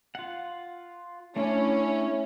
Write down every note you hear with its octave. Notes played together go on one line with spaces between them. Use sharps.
F4 F#5
A3 C#4 D4 E4